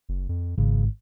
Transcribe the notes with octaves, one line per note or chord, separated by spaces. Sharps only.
F#1
F2
G#1 C#3